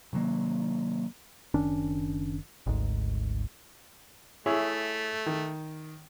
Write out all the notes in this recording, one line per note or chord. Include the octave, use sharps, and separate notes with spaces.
C3 D#3 F#3 A#3
F#1 D#3 C#4 D4
G#1 D2 G#2
A3 E4 G#4 C#5
D#3